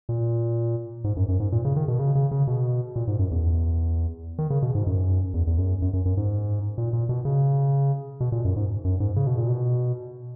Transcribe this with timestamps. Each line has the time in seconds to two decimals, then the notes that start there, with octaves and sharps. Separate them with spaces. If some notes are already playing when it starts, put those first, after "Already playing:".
0.09 A#2
1.04 G#2
1.17 F#2
1.28 F#2
1.40 G#2
1.52 A#2
1.65 C#3
1.76 D#3
1.88 B2
1.99 C#3
2.15 C#3
2.31 C#3
2.47 B2
2.96 A#2
3.07 G#2
3.19 F#2
3.31 E2
4.39 D#3
4.50 C#3
4.62 B2
4.75 G#2
4.87 F#2
5.34 E2
5.47 E2
5.58 F#2
5.82 F#2
5.93 F#2
6.05 F#2
6.17 G#2
6.78 A#2
6.93 A#2
7.09 B2
7.25 C#3
8.20 B2
8.32 A#2
8.45 F#2
8.56 G#2
8.84 F#2
9.00 G#2
9.16 C#3
9.27 B2
9.38 A#2
9.48 B2